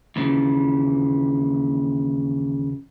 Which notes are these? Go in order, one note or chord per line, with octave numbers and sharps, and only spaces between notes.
D#2 A#2 C#3 E3